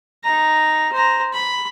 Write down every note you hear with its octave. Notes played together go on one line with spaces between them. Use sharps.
D#4 A#5
C5 A#5
B5